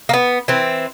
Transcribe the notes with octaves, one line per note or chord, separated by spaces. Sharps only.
A#3 B3
E3 C4